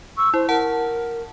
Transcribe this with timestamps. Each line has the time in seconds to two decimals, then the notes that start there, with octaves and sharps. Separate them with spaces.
0.17 C#6 E6
0.34 E4 C5
0.49 A#4 F#5 A5